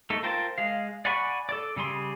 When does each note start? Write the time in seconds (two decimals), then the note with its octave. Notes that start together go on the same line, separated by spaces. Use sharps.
0.10 A3 D#4 A4
0.23 F4 A#4 C5 G5 A5
0.58 G#3 F5
1.05 D5 F#5 G#5 B5 C#6
1.49 A4 D5
1.76 C#3 G3 G#4 C6